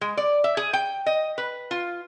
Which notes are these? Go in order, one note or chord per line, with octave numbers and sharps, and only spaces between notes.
G#3
D5
E5
G#4
G5
D#5
B4
F4